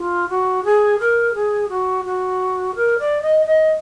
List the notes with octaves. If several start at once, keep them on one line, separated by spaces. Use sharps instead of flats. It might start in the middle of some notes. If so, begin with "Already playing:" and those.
Already playing: F4
F#4
G#4
A#4
G#4
F#4
F#4
A#4
D5
D#5
D#5